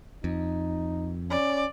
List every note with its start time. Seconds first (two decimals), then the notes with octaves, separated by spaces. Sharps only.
0.24 F2 D#4
1.30 C#4 D5